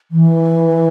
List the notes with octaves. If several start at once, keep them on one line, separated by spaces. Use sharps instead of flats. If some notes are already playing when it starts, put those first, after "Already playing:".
E3